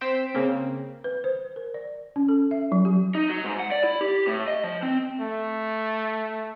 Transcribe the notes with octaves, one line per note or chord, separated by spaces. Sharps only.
C4 C5 B6 D7 E7
C#3 A#3 C4
B4
C5
A#4
D5
C#4
A4
E5
F#3
G4
D#4
F#3
G#2
F#5
D5
E4
G4
A2
D#5
F3
C4
A3